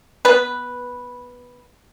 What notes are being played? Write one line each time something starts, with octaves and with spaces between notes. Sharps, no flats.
B3 B4